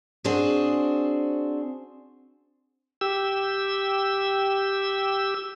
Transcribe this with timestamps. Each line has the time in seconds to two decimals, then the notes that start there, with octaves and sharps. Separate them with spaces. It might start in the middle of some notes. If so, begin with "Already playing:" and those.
0.24 C4 D4 F#4 G#4 C5
3.01 G4 E6